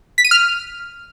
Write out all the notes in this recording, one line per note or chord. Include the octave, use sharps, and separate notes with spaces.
B6
D#7
F6